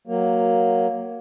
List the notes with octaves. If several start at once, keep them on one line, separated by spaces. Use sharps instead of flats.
F#3 A#3